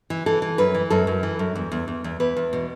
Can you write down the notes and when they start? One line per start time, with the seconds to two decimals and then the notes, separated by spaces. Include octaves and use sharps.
0.10 E3
0.26 E3 A4
0.42 E3
0.58 F#2 B4
0.75 E3
0.90 F#2 A4
1.07 F#2
1.23 E3
1.39 F#2
1.55 E2
1.72 E2
1.88 E2
2.04 E2
2.20 E2 B4
2.37 E2
2.53 B2